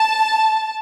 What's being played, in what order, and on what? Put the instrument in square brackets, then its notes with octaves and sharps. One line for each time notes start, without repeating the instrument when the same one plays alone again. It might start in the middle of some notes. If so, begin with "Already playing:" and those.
Already playing: [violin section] A5